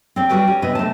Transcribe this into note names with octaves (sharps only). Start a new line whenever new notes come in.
C4 D5
G3 F#4 B4 G5
C#4
C3 B3 D#5
A3 A5